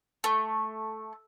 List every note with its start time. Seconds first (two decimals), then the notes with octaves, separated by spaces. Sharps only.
0.24 A3